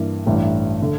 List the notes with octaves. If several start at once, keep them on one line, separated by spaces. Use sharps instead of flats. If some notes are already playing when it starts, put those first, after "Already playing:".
Already playing: G2 E3 A#3
A1 G2 E3
D3